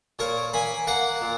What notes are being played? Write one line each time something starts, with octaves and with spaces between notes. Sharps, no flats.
A#2 A#4 C#5
A#3 G#5 B5
A#3 F#5 A#5
A#2